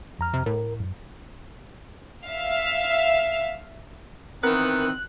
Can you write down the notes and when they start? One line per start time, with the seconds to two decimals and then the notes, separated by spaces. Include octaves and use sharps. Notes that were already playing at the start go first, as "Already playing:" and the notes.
0.19 F2 A#5 F6
0.34 C3
0.46 A2 A#4
0.80 F#2
2.26 E5 F5
4.43 D#3 E3 B3 C4 A#4 F#6